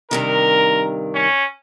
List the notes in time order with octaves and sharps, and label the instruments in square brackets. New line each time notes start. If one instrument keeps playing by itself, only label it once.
[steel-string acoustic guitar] G2 C3 D#3 [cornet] A#4
[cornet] C#4